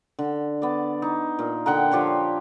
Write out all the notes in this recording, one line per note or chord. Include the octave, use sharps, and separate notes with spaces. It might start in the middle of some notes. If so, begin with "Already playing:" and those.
D3
B3 D5
D#4
A#2
D3 F#5 G5 A#5
F3 G4 C5 C#5